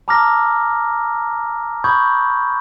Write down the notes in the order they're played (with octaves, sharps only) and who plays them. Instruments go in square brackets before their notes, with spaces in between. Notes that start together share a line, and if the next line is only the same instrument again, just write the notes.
[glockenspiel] A5 A#5 D6 E6 F6 A#6
B5 C#6 D#6 G6 G#6